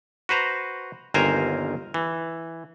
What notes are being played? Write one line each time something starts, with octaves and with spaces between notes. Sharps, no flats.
F#4 B4 C5 A#5
G1 D#2 A#4 C5 G#5 A#5
E3